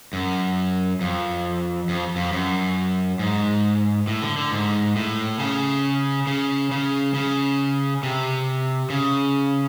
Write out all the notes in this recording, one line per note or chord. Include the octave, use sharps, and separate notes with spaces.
F#2
F2
F2
F2
F#2
G#2
A2
D3
D3
G#2
A2
C#3
C#3
C#3
C#3
C3
C#3